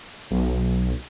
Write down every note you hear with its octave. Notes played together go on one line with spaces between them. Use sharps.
B1